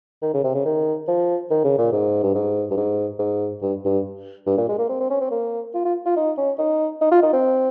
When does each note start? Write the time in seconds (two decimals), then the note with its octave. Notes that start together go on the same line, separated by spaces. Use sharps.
0.22 D#3
0.34 C#3
0.44 C3
0.55 C#3
0.65 D#3
1.08 F3
1.50 D#3
1.64 C#3
1.78 A#2
1.92 G#2
2.23 G2
2.35 G#2
2.71 G2
2.77 G#2
3.19 G#2
3.62 G2
3.85 G2
4.47 G2
4.58 A#2
4.69 G#3
4.78 A#3
4.89 C4
5.00 C4
5.10 C#4
5.21 C4
5.31 A#3
5.74 F4
5.85 F4
6.06 F4
6.17 D#4
6.38 C#4
6.59 D#4
7.01 D#4
7.11 F4
7.23 D#4
7.33 C4